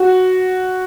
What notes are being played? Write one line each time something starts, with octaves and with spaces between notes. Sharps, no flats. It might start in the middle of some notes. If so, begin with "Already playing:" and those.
Already playing: F#4